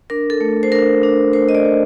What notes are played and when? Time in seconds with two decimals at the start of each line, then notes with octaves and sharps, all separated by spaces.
0.10 D4 A#4
0.30 A4
0.41 A3
0.63 C5
0.72 D4 A#4
1.03 D4
1.33 A3 C5
1.49 D#5
1.55 D5
1.64 A3